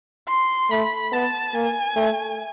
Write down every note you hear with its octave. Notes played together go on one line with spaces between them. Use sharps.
C6
A3 B5
B3 A5
A#3 G#5
A3